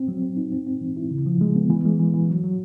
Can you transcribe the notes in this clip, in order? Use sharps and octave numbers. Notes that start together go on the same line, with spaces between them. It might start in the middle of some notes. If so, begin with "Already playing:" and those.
Already playing: C4
F#3
C4
D#4
C4
C4
E3
E4
C#3
F3
G#3
B3
E3
G#3
E3
E3
F#3
F#3